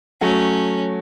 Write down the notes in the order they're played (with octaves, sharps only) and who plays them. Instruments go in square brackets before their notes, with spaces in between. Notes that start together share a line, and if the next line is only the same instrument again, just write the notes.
[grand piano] F#3 A3 [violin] C#4